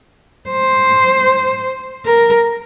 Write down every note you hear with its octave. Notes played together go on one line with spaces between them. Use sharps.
C5
A#4